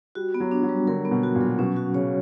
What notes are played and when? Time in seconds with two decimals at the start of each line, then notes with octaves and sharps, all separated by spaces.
0.15 G3 F#4
0.34 B3
0.40 F#3
0.51 D4
0.63 F#3
0.69 G3
0.87 D3 A#4
1.05 B3
1.11 B2
1.23 F#4
1.35 A#2
1.41 F#3
1.59 B2 C#4
1.76 F#4
1.94 C#3 C#5